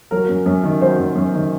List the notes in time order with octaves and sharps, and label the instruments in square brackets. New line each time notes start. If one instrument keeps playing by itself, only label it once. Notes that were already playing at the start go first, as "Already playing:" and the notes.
[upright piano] F#3 A#4
F#2
F#2
D#3
F#3 C5
F#2
F#2
D#3